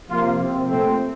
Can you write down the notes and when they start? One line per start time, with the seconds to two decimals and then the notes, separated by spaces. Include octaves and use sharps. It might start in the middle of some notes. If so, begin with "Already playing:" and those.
0.09 C3 F3 A#3 F4
0.39 C3 F3 C4
0.68 A#2 A3 C4